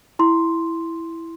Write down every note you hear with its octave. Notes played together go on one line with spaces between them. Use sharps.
E4 C6